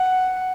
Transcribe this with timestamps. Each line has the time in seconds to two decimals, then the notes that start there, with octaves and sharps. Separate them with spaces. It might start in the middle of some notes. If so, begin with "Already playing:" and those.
Already playing: F#5